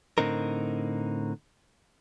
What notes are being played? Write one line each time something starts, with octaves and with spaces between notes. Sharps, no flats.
A2 D3 C4 D#4 A#4